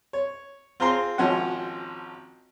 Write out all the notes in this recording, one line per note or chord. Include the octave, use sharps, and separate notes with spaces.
C#5
C4 F4 G#4 A#5 C6
G#1 F3 C#4 F#4 F#5